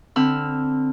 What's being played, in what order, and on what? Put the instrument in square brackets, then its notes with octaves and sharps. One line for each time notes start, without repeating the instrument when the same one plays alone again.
[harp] D3 C4 B5 E6 F6